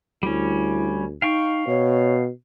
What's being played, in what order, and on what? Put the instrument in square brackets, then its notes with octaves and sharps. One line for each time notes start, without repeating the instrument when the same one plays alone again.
[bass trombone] D2 [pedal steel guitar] G3 C#4 [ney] E4
[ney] D#4 [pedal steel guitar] F5 G5 C#6
[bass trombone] B2 [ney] C#5